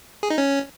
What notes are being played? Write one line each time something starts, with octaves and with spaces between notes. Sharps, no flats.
G#4
D#4
C#4